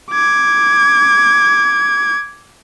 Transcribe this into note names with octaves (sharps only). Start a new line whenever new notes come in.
D6 G#6